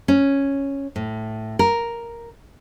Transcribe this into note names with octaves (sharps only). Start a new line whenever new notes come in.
C#4
A2
A#4